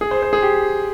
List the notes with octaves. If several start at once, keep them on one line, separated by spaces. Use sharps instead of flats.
G#4
C5
C5
G#4
G4